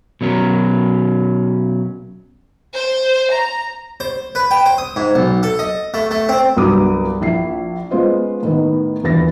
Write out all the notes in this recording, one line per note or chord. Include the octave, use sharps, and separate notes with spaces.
B2 F#3 C#4 A#4
C5
A#5
C5
B4
G5
C5
D#6
G#2
B1
A4
D#5
A3
A3
C4
C2 G2 F#3 B3 D6 D#6
A#1 E4 C7
G#3 B3 C#4 F4 C5 D#5
A2 D#3 B3
D#1 E2 D3 E3 A6 A#6